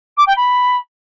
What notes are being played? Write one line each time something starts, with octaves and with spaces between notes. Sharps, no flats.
D6
G5
B5